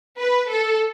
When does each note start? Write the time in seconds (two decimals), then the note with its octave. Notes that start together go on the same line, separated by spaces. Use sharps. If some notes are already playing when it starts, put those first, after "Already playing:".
0.18 B4
0.49 A4